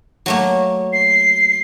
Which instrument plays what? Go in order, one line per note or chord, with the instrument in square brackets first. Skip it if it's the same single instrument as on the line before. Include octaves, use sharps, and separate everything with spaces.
[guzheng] F#3 A3 A#3
[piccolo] C7